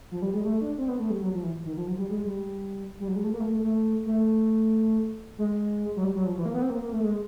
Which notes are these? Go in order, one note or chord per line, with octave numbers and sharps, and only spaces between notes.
F3
G3
G#3
A3
D4
C4
B3
A3
G3
F#3
F3
E3
D#3
F3
F#3
G3
G#3
G3
G3
F#3
G#3
A3
A#3
A3
A3
A3
A3
G#3
F#3
G3
F#3
F3
E3
A#3
B3
C4
A#3
A#3
A3
G#3